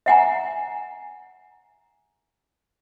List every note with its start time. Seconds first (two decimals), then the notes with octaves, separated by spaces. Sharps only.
0.06 E5 F#5 G#5 A#5